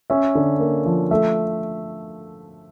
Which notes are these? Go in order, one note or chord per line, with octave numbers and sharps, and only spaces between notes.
C#4 E5
D3
A#3
F3
A3 E5